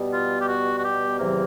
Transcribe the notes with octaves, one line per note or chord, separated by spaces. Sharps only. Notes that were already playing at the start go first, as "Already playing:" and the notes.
Already playing: B2 G3 B3
F4
G4
F#4
F#4
G4
E2 C3 D#3 F#3 A#3